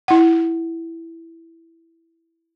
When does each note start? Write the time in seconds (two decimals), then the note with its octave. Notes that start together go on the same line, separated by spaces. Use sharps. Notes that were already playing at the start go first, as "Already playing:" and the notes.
0.08 E4 F#5